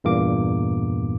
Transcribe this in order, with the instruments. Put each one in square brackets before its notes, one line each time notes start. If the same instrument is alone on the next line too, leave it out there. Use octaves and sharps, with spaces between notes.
[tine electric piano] E2 G2 A#2 A#3 D6